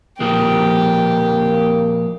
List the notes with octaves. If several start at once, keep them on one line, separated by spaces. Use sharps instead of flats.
A#2 F3 G#3 A#3 G4